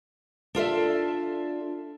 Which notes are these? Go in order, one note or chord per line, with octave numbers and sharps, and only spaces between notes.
D4 F4 A4 E5